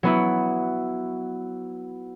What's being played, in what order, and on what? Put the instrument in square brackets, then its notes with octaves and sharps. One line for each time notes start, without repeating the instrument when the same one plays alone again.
[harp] F#3 B3 E4